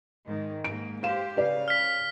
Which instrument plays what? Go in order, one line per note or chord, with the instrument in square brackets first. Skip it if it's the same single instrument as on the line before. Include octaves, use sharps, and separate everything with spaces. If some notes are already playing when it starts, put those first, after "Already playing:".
[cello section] G#2 D#3 G#3
[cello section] G#2 A#3 [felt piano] D7
[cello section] G4 C5 [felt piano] F5 E7
[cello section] C#3 F5 [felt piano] B4 D5
[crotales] F6 B6